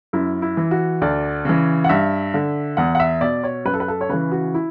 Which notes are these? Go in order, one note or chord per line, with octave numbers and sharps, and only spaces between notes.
F#2 E4
E4
E3
F#4
D2 D5
C#3 E3
F#5
G2 E5
D3
E2 F#5
F#5
E5
B2 D5
C#5
F#2 B4
A4
B4
A4
C#5
C#3 E3 B4
F#4
E4